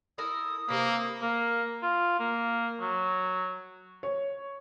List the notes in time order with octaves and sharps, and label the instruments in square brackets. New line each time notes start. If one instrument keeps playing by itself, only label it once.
[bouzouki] E4 A4 A#4 [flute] D#6
[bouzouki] C3 E3 B4 [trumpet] A#3
[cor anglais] A#3
F4
A#3
F#3
[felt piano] C#5